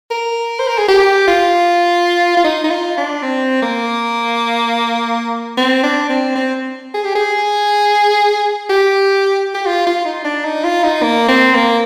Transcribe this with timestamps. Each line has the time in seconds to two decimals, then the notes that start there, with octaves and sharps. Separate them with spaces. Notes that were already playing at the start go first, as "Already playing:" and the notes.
0.11 A#4
0.59 C5
0.68 A#4
0.78 G#4
0.88 G4
1.27 F4
2.37 F4
2.44 D#4
2.64 D#4
2.70 F4
2.97 D4
3.22 C4
3.62 A#3
5.57 C4
5.83 D4
6.09 C4
6.35 C4
6.94 G#4
7.05 G4
7.15 G#4
8.70 G4
9.54 G4
9.66 F4
9.87 F4
10.05 D#4
10.24 D4
10.45 D#4
10.64 F4
10.83 D#4
11.03 A#3
11.28 C4
11.55 A#3